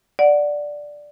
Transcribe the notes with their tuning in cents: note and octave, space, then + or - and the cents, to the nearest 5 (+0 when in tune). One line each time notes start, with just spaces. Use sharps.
D5 +0 F#5 +0